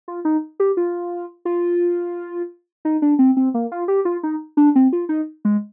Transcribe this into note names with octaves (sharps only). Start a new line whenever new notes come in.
F4
D#4
G4
F4
F4
D#4
D4
C4
C4
A#3
F4
G4
F4
D#4
D4
C4
F4
D#4
G#3